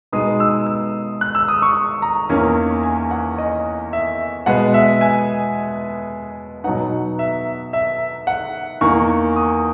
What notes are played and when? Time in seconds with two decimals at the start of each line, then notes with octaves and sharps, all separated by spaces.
0.12 B2 G#3 B3 D#4 D#6
0.40 E6
0.66 E6
1.21 F#6
1.35 E6
1.48 D#6
1.62 C#6
2.02 A#5
2.29 E2 D#3 A#3 C#4
2.83 G#5
3.11 F#5
3.38 D#5
3.93 E5
4.46 B2 G#3 B3 F#5
4.74 E5
5.01 G#5
6.64 B2 F#3 B3 D#4 F#5
7.19 E5
7.73 E5
8.27 F#5
8.81 E2 D#3 A#3 C#6
9.36 D#6